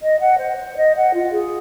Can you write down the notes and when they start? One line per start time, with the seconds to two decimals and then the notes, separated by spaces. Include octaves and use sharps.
0.01 D#5
0.21 F#5
0.38 C5
0.57 C5
0.77 D#5
0.95 F#5
1.14 F4
1.32 G#4